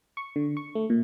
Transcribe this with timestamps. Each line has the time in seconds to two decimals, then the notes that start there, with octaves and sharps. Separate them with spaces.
0.17 C#6
0.36 D3
0.57 C#6
0.75 A3
0.90 A#2